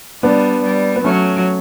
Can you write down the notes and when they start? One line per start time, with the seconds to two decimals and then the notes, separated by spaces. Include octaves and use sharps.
0.23 G3 B3 D4
0.64 G3
0.96 B3
1.04 F#3 A3 C#4